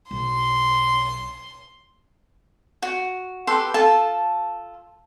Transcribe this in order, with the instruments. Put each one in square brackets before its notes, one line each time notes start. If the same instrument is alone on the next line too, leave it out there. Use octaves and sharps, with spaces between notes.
[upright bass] B1 [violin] C6
[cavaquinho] F#4
G4 A4 B4 C6
F4 A4 A5